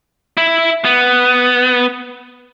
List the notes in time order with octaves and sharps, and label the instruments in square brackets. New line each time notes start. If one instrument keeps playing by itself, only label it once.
[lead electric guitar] E4
B3